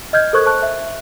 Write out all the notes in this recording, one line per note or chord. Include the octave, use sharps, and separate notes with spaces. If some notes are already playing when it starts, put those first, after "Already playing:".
D#5 F6 G6 G#6
A4 A#4 C5 C#6 F#6 G#6
C5 A5 C#6 F#6
E5